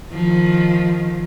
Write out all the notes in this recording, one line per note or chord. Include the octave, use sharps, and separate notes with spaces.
D#3 F3